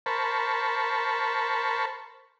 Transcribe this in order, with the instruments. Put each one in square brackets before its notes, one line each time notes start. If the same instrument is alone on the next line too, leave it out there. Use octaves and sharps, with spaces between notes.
[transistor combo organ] A#4 C5 A5 B5 C#6